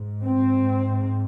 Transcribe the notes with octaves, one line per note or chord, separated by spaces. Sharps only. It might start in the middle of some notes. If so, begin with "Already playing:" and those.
Already playing: G#2
C4